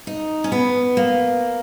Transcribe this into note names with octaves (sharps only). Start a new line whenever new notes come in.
D#4
C#4
B3
A#3